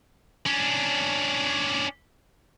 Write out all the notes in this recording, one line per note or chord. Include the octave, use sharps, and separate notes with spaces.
C#4 D4